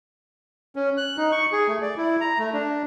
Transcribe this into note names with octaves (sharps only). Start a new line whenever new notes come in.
C#4
F#6
D#4
C#6
G#4
A3
D5
E4
A#5
A3
D4